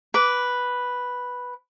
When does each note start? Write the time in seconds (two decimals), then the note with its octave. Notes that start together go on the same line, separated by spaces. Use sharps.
0.14 B4 D6